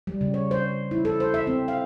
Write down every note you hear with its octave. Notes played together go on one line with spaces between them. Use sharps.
G3
C#3
C#5
C5
E4
A4
C5
E5
C4
F5